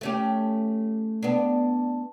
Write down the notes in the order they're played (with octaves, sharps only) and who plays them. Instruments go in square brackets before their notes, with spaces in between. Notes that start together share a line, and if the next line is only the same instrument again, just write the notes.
[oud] A3 C#4 G4
B3 D4